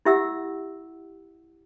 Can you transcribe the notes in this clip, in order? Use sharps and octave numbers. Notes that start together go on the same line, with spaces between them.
E4 G4 E5 F#5 E6